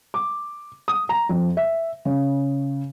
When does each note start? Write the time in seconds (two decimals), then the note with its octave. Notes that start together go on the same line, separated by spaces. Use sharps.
0.14 D6
0.88 D#6
1.09 A#5
1.29 F2
1.57 E5
2.05 C#3